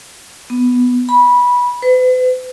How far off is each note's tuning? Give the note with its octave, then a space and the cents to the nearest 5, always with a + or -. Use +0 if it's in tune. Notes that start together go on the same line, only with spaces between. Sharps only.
B3 +0
B5 -15
B4 +45